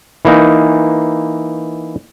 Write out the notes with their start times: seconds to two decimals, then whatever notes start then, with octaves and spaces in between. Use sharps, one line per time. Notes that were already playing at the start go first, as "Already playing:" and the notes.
0.25 E3 A#3 D#4